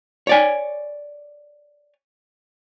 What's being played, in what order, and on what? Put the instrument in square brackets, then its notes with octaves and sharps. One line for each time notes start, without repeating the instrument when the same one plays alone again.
[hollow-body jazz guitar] C#5 D5 G#5